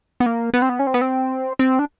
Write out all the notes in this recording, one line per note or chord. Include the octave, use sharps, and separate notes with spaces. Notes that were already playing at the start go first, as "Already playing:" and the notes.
B3
A#3
B3
C4
B3
C#4
C4
B3
C4
C4
D4